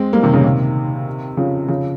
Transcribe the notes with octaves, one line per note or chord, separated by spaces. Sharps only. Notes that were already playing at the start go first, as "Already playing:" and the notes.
Already playing: G#3 C4
G3 A#3
C3 D#3
A#2 C#3
C3 D#3
C#3 F3
C#3 F3